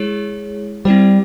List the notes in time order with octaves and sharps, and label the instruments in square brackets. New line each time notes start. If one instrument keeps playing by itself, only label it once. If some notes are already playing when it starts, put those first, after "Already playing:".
Already playing: [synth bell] G#3 E4 G#4 C#5
[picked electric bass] G3 [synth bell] C4 E4 G4 C5